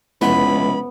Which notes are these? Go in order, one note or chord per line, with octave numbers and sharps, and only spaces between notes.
F1 C#2 B3 E4 B5